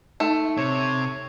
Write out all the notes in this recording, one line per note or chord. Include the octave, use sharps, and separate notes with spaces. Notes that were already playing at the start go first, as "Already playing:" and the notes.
A3 D#4
C3 C#5